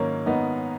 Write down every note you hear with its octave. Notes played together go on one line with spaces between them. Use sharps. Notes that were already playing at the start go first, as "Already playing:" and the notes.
Already playing: G#2 D#3 F#3 A#3 C#4
B3 D#4